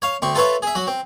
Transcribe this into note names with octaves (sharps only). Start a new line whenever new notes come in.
C#5 F5
D2 C4 C#6
F4 A4 B4 C#5 E5
G#4 E5
F#3 F#4
C4